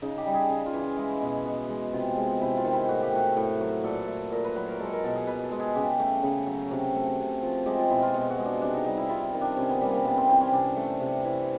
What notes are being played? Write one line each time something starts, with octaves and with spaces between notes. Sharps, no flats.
C#3 D#4
G4
G3
G#4
C#3
F4
E3
F4
G#3 E4
B2
B2
G#3
C3 F4
G#3
C3 E4
F4
D#3
E4
A2 F#4
G4
A3 F#4
A2
F#3
A#2 A4
A3
A#2 A#4
B4
F#3 B4
A#4
G#3 A4
A#4
B2 A4
G#4
B2 B4
A4
G#3
G#4
C#3 G4
A3
C#3
F#3
C3 F#4
A3
C3
F3
G#3 G4
F4
B2 E4
F4
B2 F#4
F#4
G#3
D4
C3 D4
D#4
G3 D#4
E4
C3 F4
D#3
D4
C3 C#4
B3
G3 A#3
A#3
C3 B3
C4
E3 C4
C#4
C3 D4
A3
C3
E3